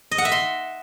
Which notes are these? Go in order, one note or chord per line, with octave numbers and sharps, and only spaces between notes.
D#5
F#5
E5
C6